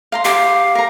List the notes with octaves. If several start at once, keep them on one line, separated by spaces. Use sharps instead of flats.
F5 A#5 C6
G4 F5
A#4 A#5